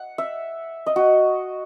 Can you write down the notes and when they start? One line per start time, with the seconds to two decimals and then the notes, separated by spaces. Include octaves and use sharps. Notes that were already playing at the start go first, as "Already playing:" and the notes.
Already playing: F#5
0.18 E5
0.86 D#5
0.96 F#4